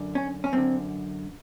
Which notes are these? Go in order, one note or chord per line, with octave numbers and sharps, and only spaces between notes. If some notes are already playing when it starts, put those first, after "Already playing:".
Already playing: F#2 D3
C#4
C#4
F#2 D3 C4